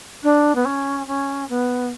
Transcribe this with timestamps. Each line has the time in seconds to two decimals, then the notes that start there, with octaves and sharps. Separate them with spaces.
0.23 D4
0.55 B3
0.65 C#4
1.07 C#4
1.49 B3